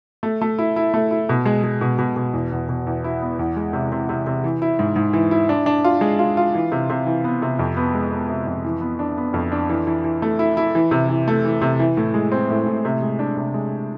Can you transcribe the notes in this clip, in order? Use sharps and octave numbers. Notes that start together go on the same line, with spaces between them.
A3
A3
E4
E4
A3
E4
B2
G#3
G#3
B2
B2
B2
E2
E2
B2
E2
E4
B3
E2
G#3
C3
C3
C3
C3
E3
E4
G#2
G#2
E3
E4
D4
D4
F4
G#3
F4
F4
E3
C3
C3
E3
B3
C3
F2
B3
G#3
B3
C3
F2
E3
B3
D4
B3
F2
D4
E3
E3
E3
A3
E4
E4
E3
C3
E3
A3
E3
C3
E3
A2
G#3
C4
A2
A2
C3
G#3
D4
C3
G#3